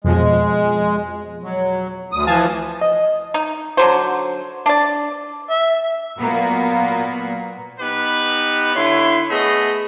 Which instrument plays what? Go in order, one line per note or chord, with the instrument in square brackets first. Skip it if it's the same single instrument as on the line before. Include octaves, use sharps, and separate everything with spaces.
[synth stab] F2 B2 F3 [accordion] G#3
[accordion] F#3
D2 D#6
[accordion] E3 F3 [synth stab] F5 G#5 A5
[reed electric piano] D#5
[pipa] D#4
D3 F#3 C5
D4 D5
[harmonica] E5
[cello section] A#2 F#3 A#3 B3
[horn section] B3 D#4 G4 B4
D3 E4 C#5 C6
A3 B3 G#4 D#5